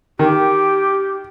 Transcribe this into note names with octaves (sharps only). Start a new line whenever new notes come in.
D#3 G4